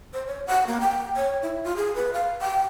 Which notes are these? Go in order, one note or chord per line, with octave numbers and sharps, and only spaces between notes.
C5
C#5
F#5
A#3
G5
C#5
E4
F4
G#4
B4
F5
G5